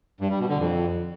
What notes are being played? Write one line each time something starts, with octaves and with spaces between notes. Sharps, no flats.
G2
G3
B2
D3
F2